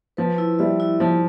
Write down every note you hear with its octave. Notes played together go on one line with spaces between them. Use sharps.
F3 B4
E4
G3 E5
E4
F3 E4